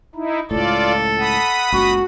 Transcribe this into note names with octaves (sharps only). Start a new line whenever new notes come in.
D#4 E4
C#2 A2 F4 A4 D5
F#5 B5 D#6
F#1 C#2 F#4